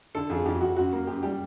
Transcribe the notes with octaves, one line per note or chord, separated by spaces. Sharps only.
D3 A4
F2 G#4
F2 G4
F2 F#4
F#2 F#4
A#3
F#2 G4
G3 G4